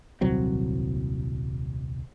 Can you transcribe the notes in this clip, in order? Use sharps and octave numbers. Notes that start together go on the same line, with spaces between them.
D#1 C2 F#3 C4